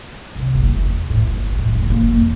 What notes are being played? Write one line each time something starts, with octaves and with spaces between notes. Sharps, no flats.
C2
F#1
E2
A2
G1
A2
F1
A#3
F2